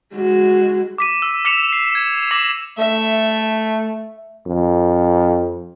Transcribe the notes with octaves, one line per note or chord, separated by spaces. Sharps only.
G#3 F#4
D6 B6 D#7
E6
D6 E6 B6 C#7 E7 F7
C7
G#6 E7
D6 A#6 C7 E7 F#7
A3 E5
F2